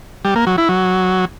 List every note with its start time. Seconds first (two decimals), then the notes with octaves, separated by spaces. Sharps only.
0.25 G3
0.36 A#3
0.47 F#3
0.58 E4
0.69 F#3